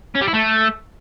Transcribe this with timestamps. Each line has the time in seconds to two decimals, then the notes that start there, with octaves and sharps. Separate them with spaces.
0.15 C#4
0.21 G3
0.27 E4
0.34 A3